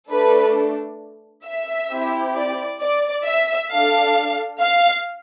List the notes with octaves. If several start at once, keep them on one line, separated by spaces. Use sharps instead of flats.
A3 D4 A4 B4
E5
C4 E4 G4
D5
D5
E5
D4 A4 F5
F5